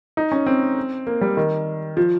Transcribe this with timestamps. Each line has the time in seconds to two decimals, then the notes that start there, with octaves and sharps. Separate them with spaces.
0.17 D#4
0.32 C#4
0.46 C4
1.07 A#3
1.21 G3
1.37 D#3
1.97 F3